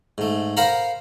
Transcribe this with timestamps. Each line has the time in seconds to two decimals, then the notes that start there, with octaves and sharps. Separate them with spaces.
0.18 G#2 A3
0.57 A#4 C5 F5 F#5 A#5 B5